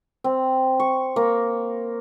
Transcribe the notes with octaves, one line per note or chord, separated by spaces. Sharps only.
C4
C#6
A#3